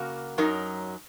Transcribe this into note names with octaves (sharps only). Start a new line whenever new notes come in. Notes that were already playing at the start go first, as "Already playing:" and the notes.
Already playing: C#3 A#3 F#4 A#4
F#2 F#3 D#4 A#4